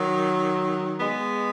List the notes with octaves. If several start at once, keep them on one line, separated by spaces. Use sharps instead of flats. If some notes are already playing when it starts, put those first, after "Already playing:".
Already playing: D#3 F#3
G#3 B3